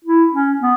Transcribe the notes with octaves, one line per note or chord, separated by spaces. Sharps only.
E4
C#4
B3